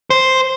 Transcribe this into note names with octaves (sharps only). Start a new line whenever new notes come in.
C5